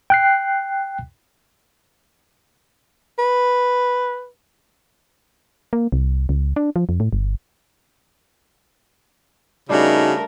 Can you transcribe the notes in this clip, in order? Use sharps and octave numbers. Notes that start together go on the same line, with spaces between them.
G5 F#6 C7
B4
A#3
C2
C#2
D4
F3
F2
A2
G1
C#3 G3 A3 D4 D#4 F#4 A#4 F5